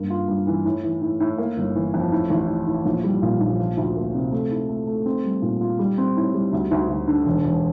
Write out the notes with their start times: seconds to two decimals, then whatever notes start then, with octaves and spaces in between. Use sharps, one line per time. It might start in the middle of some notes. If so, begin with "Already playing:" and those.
Already playing: G2 A#3
0.10 F4
0.28 G2
0.47 E3
0.65 A2
0.84 E3
1.02 A2
1.20 A2
1.38 A#3
1.57 G1
1.75 E3
1.94 F2
2.12 A2
2.30 A1
2.49 A2
2.67 A2
2.85 A#1
3.04 G3
3.22 A#2
3.40 A#1
3.59 F3
3.77 D2
3.96 A#3
4.14 C3
4.32 A3
4.51 E4
4.69 A3
4.87 A3
5.06 C4
5.24 G3
5.42 A#2
5.61 F4
5.79 G3
5.98 C4
6.17 A2
6.34 G3
6.52 D2
6.71 D2
6.89 D2
7.07 D3
7.26 E1
7.44 E1